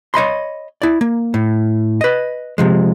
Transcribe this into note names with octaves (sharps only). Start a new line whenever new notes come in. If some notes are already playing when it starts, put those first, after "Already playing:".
C#5 D#5 B5 C6
E4 D5
A#3
A2
B4 D#5
C3 F3 G#3